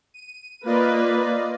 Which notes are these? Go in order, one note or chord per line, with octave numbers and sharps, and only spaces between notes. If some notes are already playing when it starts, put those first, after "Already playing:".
D#7
A#3 F4 B4 D5 D#5